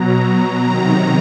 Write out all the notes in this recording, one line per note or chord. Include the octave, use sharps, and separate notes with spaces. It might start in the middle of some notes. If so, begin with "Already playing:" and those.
Already playing: B2 F#3 A#5
C3 D#3 F#3 A#5